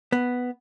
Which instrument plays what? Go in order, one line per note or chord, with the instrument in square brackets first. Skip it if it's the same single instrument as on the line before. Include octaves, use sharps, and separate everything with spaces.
[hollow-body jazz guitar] B3